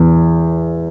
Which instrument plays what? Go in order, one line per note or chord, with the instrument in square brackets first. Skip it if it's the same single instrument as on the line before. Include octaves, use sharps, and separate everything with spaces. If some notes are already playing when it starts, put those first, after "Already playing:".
Already playing: [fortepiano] E2